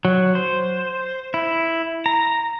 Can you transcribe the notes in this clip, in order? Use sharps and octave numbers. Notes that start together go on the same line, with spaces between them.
F#3
C5
E4
A#5